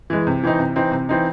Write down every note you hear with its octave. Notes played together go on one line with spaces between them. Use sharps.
E3 G#3
C3
E3 C4 D#4
C3
E3 C4 D#4
C3
E3 C4 D#4